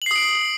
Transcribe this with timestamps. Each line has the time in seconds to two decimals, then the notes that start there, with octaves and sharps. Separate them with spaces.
0.02 F#7
0.06 C7
0.11 D#6
0.16 D7